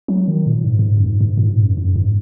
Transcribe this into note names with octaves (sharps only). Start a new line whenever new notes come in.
F#3
D#3
A#2
G#2
G#2
F#2
G#2
G#2
A#2
G#2
F#2
F#2
G#2